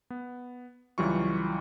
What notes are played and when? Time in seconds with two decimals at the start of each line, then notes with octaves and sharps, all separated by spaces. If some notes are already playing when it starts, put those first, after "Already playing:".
0.10 B3
0.98 C#2 E3 F#3 G3 F4 C#6